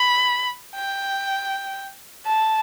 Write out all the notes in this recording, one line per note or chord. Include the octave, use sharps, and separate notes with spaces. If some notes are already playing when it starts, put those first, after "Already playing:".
Already playing: B5
G5
A5